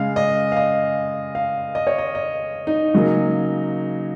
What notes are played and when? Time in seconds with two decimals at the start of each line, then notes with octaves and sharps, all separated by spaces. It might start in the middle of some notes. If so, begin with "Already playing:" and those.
Already playing: C#3 G#3 F5
0.16 D#5
0.52 F5
0.56 D#5
1.35 F5
1.75 D#5
1.87 C#5
1.98 D#5
2.15 D#5
2.67 D#4
2.94 C#3 F#3 A#3